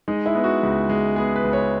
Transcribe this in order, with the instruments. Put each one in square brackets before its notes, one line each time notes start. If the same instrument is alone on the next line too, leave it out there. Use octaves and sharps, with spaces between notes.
[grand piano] G#3 D#4
E4
B3
F#4
C#2
G#3
B3 G#4
B4
C#2
C#5